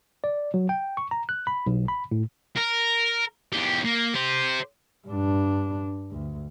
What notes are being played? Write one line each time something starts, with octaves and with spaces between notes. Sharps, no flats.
D5
F#3
G5
C#6
A#5
F#6
B5
B1
B5
A2
A#4
E2 G4
A#3
G4 C5
G2 D4
D2